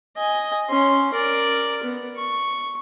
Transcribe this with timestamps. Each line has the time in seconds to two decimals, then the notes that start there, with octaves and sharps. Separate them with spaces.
0.16 D#5 G#5
0.70 C#4 C6
1.14 A#4 D5
1.83 B3
2.17 C#6